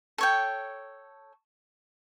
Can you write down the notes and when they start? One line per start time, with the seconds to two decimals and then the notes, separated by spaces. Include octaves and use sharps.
0.18 A4 C#5 G5